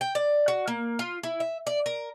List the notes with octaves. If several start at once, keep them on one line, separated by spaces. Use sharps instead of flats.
G5
D5
F#4
A#3
F4
E4
E5
D5
A#4